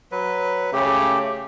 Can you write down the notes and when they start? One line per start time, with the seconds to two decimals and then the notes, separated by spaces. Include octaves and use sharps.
0.12 F#3 B4
0.73 C#3 A3 G4